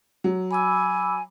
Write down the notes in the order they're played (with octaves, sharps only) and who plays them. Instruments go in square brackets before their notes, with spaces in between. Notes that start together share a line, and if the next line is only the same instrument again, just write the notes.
[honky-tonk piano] F#3
[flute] G#5 [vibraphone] B5 D6 E6